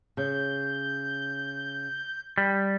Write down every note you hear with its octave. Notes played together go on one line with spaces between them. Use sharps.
C#3 G6
G3